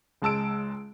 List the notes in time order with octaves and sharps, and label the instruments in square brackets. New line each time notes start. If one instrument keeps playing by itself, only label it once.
[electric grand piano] C#2 G#3 A5 E6 D7